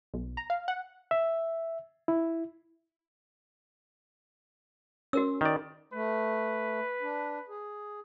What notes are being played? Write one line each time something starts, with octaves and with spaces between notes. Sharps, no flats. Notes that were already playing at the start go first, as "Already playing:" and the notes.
B1
A#5
F5
F#5
E5
E4
C#4 F#4 A#4 E6
D#3 D5
A3 B4
D4
G#4